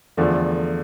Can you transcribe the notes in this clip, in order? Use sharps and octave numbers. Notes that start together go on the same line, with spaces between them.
E2 D3 F3 A3 D4